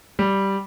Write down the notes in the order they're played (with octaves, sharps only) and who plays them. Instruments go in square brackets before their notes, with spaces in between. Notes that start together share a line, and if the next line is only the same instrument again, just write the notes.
[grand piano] G3